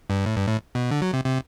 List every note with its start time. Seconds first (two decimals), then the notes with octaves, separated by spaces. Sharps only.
0.10 G2
0.26 A2
0.37 G2
0.48 A2
0.75 B2
0.91 D3
1.02 F#3
1.13 C3
1.24 C3